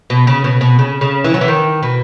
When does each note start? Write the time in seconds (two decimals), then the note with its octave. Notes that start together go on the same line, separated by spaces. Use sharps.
0.10 B2
0.27 C#3
0.44 B2
0.61 B2
0.79 C#3
1.01 C#3
1.24 E3
1.34 F#3
1.41 E3
1.48 D#3
1.83 B2